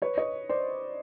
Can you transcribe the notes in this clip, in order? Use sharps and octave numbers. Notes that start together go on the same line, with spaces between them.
B4 C#5
C#5 D#5
C5 D5